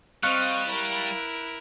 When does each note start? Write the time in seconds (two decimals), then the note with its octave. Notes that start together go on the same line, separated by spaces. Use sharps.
0.23 G3 C4 D#5 F5 C#6 F#6
0.66 E4 A#4